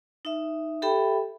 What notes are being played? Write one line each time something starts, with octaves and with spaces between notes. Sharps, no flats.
D#4 E5
G4 A4 E5 G5 B5